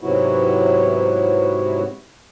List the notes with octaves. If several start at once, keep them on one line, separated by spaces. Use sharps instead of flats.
G#2 C3 F#3 B3 E4 F#4